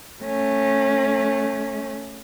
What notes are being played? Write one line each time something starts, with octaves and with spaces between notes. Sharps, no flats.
A3 C#4